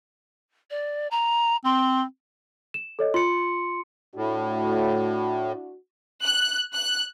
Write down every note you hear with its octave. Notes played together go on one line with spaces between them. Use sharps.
D5
A#5
C4 C6
E7
A4 C#5 D#5
F4 C6 C#7
A2 D4 E4 F#4
F#6
F#6